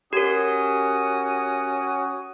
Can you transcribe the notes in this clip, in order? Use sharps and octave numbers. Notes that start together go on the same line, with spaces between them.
C#4 F#4 G4 A#4 D#6